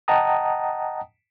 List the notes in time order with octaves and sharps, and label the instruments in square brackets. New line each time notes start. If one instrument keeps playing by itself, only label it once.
[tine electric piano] D#5 F#5 G5 A5 A#5 D#6